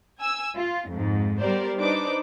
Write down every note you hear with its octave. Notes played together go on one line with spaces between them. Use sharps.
G#5 E6
F4
F2 G#2
G3 B3 G4 A#4 C5 D5
D4 D#4 B4 C5 D6